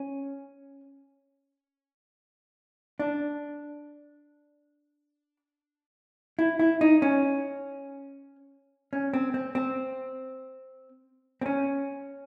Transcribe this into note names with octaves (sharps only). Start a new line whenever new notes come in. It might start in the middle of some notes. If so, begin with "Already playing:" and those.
Already playing: C#4
D4
E4
E4
D#4
C#4
C#4
C4
C4
C4
C4
C#4